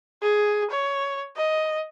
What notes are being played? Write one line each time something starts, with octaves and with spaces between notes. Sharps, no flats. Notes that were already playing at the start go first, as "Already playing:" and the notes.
G#4
C#5
D#5